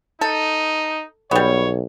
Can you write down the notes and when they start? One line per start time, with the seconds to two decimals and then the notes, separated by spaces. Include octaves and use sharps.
0.21 D#4 A4
1.31 B1 G3 B3 C#5